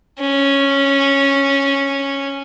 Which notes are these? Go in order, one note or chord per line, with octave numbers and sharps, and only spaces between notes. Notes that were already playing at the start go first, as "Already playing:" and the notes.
C#4